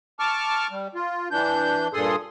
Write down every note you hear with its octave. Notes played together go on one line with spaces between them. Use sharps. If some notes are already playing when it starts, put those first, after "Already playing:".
A5 C#6 D6 F6
G3
F4
E3 D4 G6
G2 A#2 G#4 A4 C6 D#6